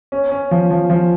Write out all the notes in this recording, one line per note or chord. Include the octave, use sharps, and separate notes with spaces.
C#4
C#4
F3
F3
F3